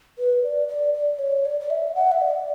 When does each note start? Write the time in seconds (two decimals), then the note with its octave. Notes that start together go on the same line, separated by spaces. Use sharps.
0.18 B4
0.43 D5
0.68 D5
0.94 D5
1.19 C#5
1.45 D5
1.60 D5
1.70 E5
1.95 F#5
2.11 E5
2.21 D5